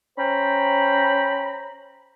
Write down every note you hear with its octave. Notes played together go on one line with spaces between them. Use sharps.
C#4 C5 G5 A#5 B5